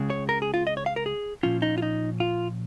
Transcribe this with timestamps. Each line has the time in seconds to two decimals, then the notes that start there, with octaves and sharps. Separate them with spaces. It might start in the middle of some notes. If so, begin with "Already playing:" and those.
Already playing: C#2 C#3 G#3
0.10 C#5
0.29 A#4
0.42 G#4
0.54 F4
0.67 D#5
0.77 C#5
0.86 F5
0.96 A#4
1.06 G#4
1.43 A#2 F3 C#4 F4
1.62 D#4
1.78 F4
1.82 D#4
2.20 F4